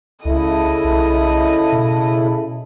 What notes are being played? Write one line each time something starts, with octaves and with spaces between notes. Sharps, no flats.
C#2 C#3 E4 A4 D#5
B1
B2